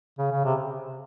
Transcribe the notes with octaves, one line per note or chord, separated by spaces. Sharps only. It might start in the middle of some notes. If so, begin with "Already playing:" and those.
C#3
C#3
C3